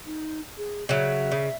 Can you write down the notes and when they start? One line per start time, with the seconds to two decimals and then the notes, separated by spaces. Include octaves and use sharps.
0.06 D#4
0.58 G#4
0.89 C#3 F#3 E5
1.32 C#3